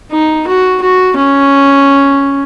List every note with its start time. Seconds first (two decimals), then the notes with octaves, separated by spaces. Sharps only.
0.11 D#4
0.47 F#4
0.82 F#4
1.17 C#4